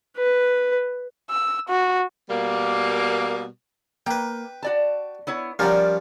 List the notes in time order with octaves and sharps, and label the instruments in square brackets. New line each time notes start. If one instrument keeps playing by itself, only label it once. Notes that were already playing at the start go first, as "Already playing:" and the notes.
[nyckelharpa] B4
[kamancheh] E6
F#4
[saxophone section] B2 G3 A#3
[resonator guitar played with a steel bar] A#3 [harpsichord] B4 G5
[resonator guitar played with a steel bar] F#4 D5 A5
B3 E4 C#5
[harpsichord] F3 G3 C#4 [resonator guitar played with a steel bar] A#4 D5 F#5